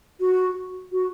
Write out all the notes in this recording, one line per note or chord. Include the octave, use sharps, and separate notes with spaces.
F#4
F#4